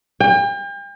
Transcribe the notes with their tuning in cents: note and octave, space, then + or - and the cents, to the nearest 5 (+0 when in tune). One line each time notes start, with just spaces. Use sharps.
G5 +40